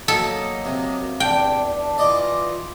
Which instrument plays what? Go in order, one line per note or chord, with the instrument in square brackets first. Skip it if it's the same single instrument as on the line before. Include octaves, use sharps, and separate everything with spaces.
[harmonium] F#3 A#3 D#5 [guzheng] A4
[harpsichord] C3
[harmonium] E2 D4 [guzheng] G5
[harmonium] E3 F4 [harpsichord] D5 D#5 D6